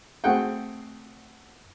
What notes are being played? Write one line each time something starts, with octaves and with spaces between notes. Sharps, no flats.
A3 C4 F#4 G#4 F#5 G5